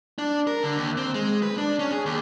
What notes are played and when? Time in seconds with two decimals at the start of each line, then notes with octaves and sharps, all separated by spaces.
0.19 D4
0.47 A#4
0.63 D3
0.77 D#2
0.97 C4
1.14 G#3
1.43 B4
1.58 D4
1.79 C#4
1.92 G#4
2.06 D#2